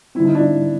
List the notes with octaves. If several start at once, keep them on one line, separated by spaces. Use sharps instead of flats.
D3 G3 C4 E4
D#4
D4 E4